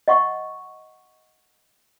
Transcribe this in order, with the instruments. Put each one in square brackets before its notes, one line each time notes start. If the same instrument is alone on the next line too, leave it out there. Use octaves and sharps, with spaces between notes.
[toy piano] D#5 F#5 C#6